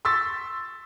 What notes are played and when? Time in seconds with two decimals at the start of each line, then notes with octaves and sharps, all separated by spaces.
0.05 C6 C#6 E6 A6 B6